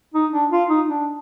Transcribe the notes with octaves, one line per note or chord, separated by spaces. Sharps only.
D#4
D4
F4
D#4
D4